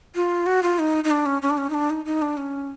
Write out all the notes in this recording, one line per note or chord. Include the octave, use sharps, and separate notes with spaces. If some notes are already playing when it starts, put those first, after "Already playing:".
F4
F#4
F4
D#4
D#4
D4
C#4
C#4
D4
C#4
D#4
D4
D#4
D#4
D4
C#4